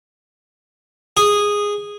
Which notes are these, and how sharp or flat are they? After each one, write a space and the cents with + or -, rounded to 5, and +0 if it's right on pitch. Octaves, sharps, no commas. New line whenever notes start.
G#4 -10